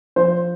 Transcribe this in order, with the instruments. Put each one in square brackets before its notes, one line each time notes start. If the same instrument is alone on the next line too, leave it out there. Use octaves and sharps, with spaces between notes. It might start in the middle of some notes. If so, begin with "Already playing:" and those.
[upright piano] F3 C5